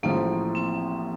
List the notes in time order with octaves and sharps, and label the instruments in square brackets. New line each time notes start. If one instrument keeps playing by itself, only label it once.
[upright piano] A1 A2 F3 G#3 [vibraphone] A#3
[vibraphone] C4